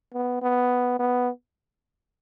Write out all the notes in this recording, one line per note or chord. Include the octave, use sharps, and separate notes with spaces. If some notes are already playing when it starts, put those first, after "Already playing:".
B3
B3
B3